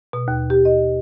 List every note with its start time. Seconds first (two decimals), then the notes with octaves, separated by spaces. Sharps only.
0.13 B2
0.28 D#2
0.50 G4
0.65 D#5